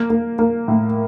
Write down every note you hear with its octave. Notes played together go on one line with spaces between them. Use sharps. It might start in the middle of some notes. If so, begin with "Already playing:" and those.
Already playing: A#3
A#3
A#3
A2